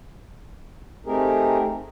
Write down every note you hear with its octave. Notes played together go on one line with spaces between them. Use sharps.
A3 C4 D#4 G4 G#4 A#4